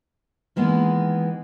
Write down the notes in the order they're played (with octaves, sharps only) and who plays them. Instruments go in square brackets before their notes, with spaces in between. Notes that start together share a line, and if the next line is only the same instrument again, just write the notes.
[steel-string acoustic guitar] D#3 E3 G#3 A#3 B3